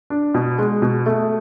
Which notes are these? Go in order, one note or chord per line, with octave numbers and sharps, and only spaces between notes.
D4
B2
G#3
B2
A3